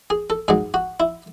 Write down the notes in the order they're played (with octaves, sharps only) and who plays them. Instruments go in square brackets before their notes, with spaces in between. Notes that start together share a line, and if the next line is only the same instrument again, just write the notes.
[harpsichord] G#4
A4
G#2 F#3 G#4
F#4
E4